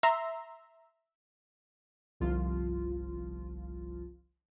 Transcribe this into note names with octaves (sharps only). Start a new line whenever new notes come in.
E5 A#5 C6
G1 C2 F3 F4